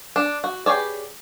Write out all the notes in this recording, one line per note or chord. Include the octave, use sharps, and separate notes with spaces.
D4
F#4
G4 G#4 B4 C#5 D5